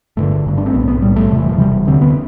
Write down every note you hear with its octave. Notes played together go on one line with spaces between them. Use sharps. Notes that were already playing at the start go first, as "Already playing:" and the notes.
G1 G2 D3 A3
G1 G2 D3
D4
C4
B1 A2 B3
B3
B1 A2 G3
A3
E1 E2 C3
E3
F3
E1 E2 C3 G3
D2 D3 C4
B3